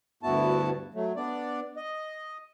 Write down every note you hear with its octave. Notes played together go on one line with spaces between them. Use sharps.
D2 G2 B3 E4 F#4 A5
F#3 A3
B3 D4 D5
D#5